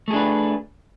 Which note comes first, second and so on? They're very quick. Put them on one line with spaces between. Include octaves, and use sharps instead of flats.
A3 G#4 D4 B4